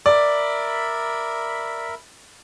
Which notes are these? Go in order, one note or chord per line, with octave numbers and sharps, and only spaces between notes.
A#4 D5 E5 B5